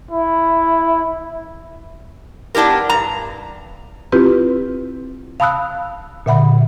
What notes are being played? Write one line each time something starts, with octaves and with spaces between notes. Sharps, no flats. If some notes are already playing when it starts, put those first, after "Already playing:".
E4
B3 D4 E4 G4 A#4
G2 A#5
C4 E4 F4 G4 B4
F5 A5 B5 D#6 E6 F#6
A#2 D3 E5 F#5 B5